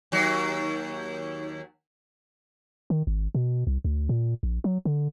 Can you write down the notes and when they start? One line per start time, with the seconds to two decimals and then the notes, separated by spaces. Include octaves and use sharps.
0.12 D#2 F#3
2.90 D#3
3.07 G#1
3.35 B2
3.67 C2
3.85 D2
4.09 A#2
4.43 A#1
4.64 F#3
4.85 D3